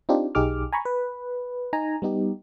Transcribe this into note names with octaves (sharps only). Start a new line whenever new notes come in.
C4 D4 D#4 F4 G4
B1 D#4 G4 G#4 D6 F6
G#5 A#5 B5 C#6
B4
D#4 G#5 A#5
G3 B3 D#4 G4